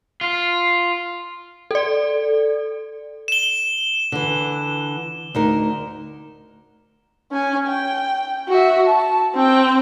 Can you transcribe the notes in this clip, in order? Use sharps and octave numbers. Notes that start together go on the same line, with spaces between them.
F4
A4 D5
E7 G7
D3 E3
D2 D#4 A#4
C#4 G#5
G5
F#4 E5
A5
C4 G5